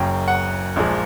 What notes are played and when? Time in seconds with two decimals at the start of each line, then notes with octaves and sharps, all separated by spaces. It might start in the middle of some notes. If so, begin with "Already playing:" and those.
Already playing: F#1 F#2 C#3 G5
0.28 F#5
0.76 A#1 A#2 F3 G#3